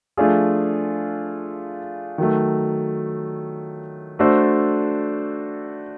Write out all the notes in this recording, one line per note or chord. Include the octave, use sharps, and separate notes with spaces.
F3 A3 D4 F4 G#4
D#3 F#3 A3
A3 D4 F#4 A4 C5